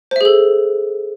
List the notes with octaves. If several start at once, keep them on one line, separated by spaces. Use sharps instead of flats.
G#4 A4 C5 E5